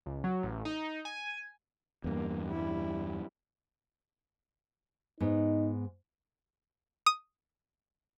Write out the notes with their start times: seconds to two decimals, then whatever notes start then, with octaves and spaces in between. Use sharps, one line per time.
0.06 C#2
0.24 F#3
0.43 A1
0.65 D#4
1.05 G#5
2.04 E2 G2 A#3
2.50 G3 E4
5.20 G#2 B3 D#4
7.06 D#6 D#7